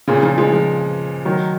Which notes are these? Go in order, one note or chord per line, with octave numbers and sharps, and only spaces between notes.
A#2 C#3
C#3 F3
F3 G#3
F3 G#3
D#3 F#3